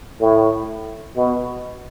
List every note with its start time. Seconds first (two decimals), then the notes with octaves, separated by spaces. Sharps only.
0.20 A2
1.17 B2